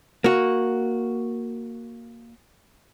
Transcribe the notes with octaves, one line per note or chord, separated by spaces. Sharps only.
A#3 F#4